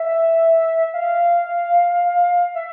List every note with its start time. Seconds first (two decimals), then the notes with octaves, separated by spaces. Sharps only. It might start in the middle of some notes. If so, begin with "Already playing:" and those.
Already playing: E5
0.94 F5
2.55 E5